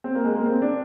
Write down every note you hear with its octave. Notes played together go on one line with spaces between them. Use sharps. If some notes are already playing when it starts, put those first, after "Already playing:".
C4
A#3
G#3
A#3
C4
D4